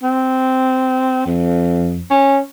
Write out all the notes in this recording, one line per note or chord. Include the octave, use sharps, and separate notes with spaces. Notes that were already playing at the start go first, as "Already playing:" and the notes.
C4
F2
C#4